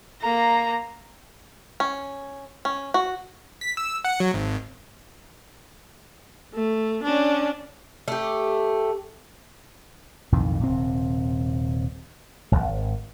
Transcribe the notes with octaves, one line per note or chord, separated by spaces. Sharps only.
A#3 A#5
C#4
C#4
F#4
B6
E6
F#5
F#3
G#1
A3
C#4 D4
A3 G4
B1 F2 A2 D#3
D#1 C3 C4
D#1 G#1